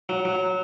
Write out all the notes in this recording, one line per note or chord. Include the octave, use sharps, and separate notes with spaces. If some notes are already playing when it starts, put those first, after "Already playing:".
F#3
F#3